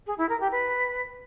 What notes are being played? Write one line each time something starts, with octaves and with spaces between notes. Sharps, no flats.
G#4
E4
A#4
G4
B4